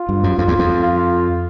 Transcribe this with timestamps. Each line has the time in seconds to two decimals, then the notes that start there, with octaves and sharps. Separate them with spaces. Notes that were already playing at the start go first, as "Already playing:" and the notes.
Already playing: F4
0.09 G2
0.24 F#2
0.38 F2 F4
0.48 E2
0.59 F2
0.83 F4